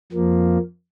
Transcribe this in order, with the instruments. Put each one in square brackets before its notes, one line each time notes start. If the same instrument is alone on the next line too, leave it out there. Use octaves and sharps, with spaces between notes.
[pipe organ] F2 F3 A#3